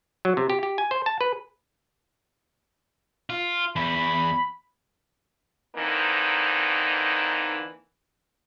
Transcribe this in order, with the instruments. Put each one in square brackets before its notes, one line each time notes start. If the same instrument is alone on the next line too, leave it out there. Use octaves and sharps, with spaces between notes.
[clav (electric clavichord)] F#3
C3
G4
G4
G#5
C5
A5
B4
[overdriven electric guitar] F4
[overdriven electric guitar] E2 [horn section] B5
[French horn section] D3 E3 A#3 C4 D#4